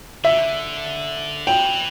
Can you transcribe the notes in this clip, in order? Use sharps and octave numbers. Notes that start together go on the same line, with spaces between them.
D3 E5
E3 G5